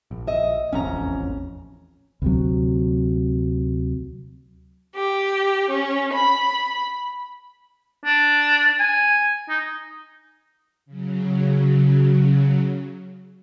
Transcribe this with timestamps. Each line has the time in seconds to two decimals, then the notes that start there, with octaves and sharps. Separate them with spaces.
0.11 A#1
0.27 D#5 E5
0.73 E1 A1 F2 C#4 A#5
2.22 D2 C3 F#3
4.96 G4
5.70 C#4
6.14 B5
8.05 D4
8.80 G#5
9.49 D#4
10.86 C#3 F#3